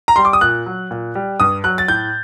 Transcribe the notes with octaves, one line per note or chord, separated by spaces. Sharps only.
A#5
G3 C6
D6
D#6
A#2 F#6
F#3
A#2
G3
G2 D#6
F#3 F#6
A6
A2 G6